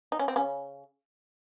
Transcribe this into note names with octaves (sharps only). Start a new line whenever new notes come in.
D#4
C#4
C4
C#3 C#4